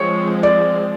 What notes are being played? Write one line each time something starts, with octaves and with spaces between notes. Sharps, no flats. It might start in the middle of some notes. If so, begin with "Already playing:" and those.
Already playing: F3 G#3 C4 C#5
D5